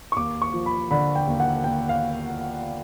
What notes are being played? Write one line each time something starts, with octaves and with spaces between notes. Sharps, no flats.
C#6
D#2 D6
C#6
F3
B5
D3 B5
G5
D#2
F#5
D#2 G5
F5